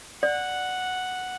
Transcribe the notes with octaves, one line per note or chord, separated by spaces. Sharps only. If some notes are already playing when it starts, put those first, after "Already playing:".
D5 F#5